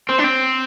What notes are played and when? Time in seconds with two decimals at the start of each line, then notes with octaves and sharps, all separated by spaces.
0.09 C4
0.18 D4
0.24 C4